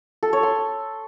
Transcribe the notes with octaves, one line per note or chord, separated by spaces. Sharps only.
A4
C#5
C6